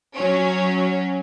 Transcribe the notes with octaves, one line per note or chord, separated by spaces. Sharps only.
F#3 C#4